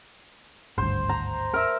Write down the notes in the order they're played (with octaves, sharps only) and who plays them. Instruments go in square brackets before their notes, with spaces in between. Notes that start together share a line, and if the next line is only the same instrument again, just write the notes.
[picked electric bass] G#1 D2 G2 [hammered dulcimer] C5
[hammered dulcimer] A#5
A#4 E5